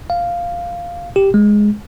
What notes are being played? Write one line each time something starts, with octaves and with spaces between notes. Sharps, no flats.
F5
G4
G#3